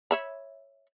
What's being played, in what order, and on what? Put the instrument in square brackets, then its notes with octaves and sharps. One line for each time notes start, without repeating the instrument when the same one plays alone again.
[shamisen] C#5 E5 B5